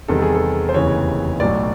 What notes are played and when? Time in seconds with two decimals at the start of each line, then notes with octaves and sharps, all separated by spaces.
0.08 E2 C3 D#3 G3 A4
0.22 G#4
0.35 A4
0.69 C5
0.74 F1 D#2 C#3 E3 C#5
1.40 B1 A2 F#3 D5